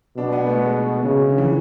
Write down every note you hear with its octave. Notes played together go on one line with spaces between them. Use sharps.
B2 D4
B3
A3
G#3
C#3
D3
E3